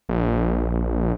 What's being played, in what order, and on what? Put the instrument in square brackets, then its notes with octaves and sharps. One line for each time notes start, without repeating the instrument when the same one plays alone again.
[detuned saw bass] A#1